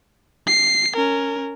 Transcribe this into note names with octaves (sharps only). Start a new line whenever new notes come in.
C7
C#4 A#4